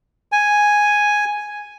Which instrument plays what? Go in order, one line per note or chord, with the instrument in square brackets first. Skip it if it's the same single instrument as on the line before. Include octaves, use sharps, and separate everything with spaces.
[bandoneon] G#5